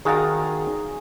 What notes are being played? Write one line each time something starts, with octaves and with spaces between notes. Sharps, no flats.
D#3 F#4 G#4 D5 F5 A#5